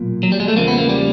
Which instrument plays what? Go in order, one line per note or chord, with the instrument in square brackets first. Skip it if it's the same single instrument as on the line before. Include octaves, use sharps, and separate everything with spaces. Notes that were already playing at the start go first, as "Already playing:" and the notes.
Already playing: [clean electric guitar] B1 A#2
F#3
G3
G#3
A3
E2 C#3 F3 A#3
B3
A#3
G3